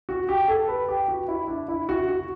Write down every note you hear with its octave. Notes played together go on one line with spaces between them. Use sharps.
F#4
G4
A4
B4
G4
F#4
E4
D4
E4
F#4
F#4